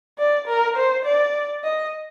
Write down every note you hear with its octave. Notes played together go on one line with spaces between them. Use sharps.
D5
A#4
C5
D5
D#5